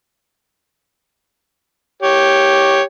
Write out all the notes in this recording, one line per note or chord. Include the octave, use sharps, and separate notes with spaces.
G4 C#5